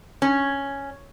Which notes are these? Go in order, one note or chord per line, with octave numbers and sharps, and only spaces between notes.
C#4